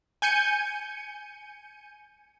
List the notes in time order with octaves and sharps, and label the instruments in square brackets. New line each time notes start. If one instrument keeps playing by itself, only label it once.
[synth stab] G#5 G6 C#7 D#7